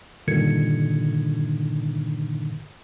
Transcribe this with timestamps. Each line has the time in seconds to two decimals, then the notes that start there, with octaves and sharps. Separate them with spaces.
0.28 G2 A#2 D3 D#3 G#6 C#7